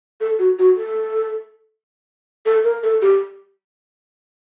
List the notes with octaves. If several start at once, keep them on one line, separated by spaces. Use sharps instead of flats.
A4
F#4
F#4
A4
A4
A#4
A4
G4